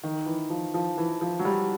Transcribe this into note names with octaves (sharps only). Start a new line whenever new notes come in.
D#3
E3
F3
F3
E3
F3
F#3
G3